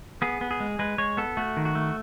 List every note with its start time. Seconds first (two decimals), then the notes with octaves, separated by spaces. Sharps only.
0.22 B3 G#4
0.41 B3
0.51 G#4
0.60 G#3
0.79 G#3 B4
0.98 G#3 C#5
1.17 B3 A4
1.37 A3 F#4
1.57 D#3
1.65 F#4
1.75 A3